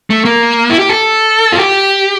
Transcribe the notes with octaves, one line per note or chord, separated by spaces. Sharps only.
A3
A#3
E4
G4
A4
F4
G4